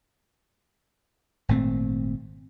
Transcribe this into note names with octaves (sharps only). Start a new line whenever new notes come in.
G#1 A#2 A3 C4